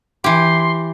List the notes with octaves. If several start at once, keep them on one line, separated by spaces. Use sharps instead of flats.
E3 G4 C6